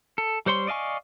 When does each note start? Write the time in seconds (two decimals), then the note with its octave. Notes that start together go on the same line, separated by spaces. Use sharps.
0.18 A4
0.46 G3 C5 C#5 C6
0.67 D5 D#5 F5 G#5 C#6